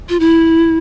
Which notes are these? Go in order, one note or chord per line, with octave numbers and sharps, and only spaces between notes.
F4
E4